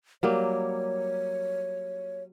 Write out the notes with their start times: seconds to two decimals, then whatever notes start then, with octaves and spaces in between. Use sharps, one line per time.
0.23 F#3 G3 A#3 C#5